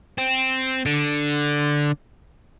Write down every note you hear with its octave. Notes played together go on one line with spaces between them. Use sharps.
C4
D3